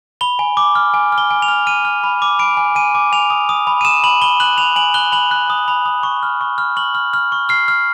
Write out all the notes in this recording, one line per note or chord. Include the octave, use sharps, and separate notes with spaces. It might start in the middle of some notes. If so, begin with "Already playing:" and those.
B5 G7
G#5
D6
F6
G#5
F6
G7
G#5
F7
F6
F6 D#7
F6
B5
D6
B5 D7
G#5
G#5 D#7
D6
G#5 F7
D#6
D#6
B5
D#7
D#6 E7
B5 F#7
B5 G7
F#6 F#7
B5 F7
G#5 F#7
F#6 G7
B5 F#7
F#6
D#6
B5
D#6
C#6
F6
C#6
F6
C#6 F#7
F6
F6
C#6
F6 C7
F6